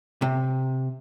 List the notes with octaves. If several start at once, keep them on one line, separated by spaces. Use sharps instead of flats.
C3